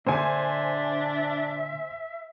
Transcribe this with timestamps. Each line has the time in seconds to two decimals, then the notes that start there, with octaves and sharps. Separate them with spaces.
0.07 A#2 D3 D4 C5 E5 G#5